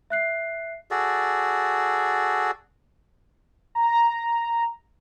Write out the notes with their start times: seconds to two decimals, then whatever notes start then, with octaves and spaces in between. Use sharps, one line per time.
0.10 E5 F#6 C7
0.91 F#4 G#4 A4 D5
3.75 A#5